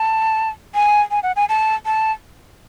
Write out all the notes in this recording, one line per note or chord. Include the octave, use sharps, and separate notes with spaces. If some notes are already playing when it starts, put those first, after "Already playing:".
Already playing: A5
G#5
G#5
F#5
G#5
A5
A5